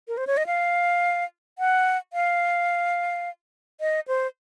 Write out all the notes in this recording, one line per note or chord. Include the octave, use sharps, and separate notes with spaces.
A#4
C5
C#5
D#5
F5
F#5
F5
D#5
C5